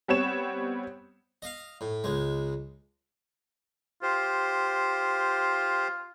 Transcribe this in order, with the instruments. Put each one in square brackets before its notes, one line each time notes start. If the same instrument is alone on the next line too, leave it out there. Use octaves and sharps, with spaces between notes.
[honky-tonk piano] G3 B3 C4 C#5 E7
[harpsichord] D#5 F5
A2
C#2 G#3
[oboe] F4 [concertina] G4 C5